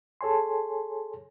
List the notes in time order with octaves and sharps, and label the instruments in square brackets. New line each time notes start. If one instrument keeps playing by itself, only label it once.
[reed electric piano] G#4 A4 C#5 G#5 C6